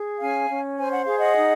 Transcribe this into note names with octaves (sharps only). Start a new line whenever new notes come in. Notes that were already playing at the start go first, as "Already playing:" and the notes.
Already playing: G#4
C#4 F5 G#5
C#4
C5 G#5
F#5
G#4 F5
D#5 F#5
D#4